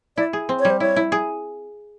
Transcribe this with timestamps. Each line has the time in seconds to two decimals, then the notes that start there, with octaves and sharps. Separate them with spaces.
0.17 E4 D5
0.33 G#4
0.49 C4
0.59 C#5
0.65 G3
0.70 C5
0.80 E4 C#5
0.96 E4
1.12 G#4